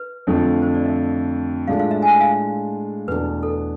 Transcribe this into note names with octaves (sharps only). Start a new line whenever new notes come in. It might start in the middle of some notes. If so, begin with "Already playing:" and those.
Already playing: B4
F2 D3 F3 A3
C5
D5
E5
A2 G#3 D4 F4 A4 F5
F5
E5
G#5
F5
E2 B2 A3 D4 B4
A4